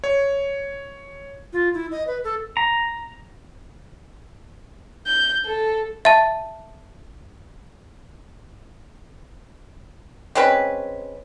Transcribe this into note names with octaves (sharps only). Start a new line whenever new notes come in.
C#5
F4
E4
D#5
B4
A4
A#5
G6
A4
E5 A5
G#3 C4 C#4 B4